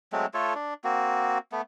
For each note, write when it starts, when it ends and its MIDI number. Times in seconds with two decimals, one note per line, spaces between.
0.12 0.26 54
0.12 0.26 56
0.12 0.26 57
0.12 0.26 60
0.34 0.53 57
0.34 0.53 65
0.34 0.53 69
0.34 0.53 73
0.55 0.74 62
0.84 1.38 58
0.84 1.38 60
0.84 1.38 66
1.52 1.61 57
1.52 1.61 59